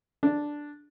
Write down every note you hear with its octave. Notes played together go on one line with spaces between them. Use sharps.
D4